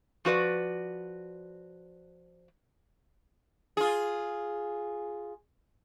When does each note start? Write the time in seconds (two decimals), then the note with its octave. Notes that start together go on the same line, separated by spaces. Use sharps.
0.25 F3 F#4 B4 D5
3.77 F4 G#4